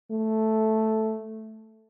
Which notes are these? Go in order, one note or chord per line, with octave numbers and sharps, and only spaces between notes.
A3